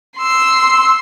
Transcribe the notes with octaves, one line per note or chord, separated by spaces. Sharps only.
C6 E6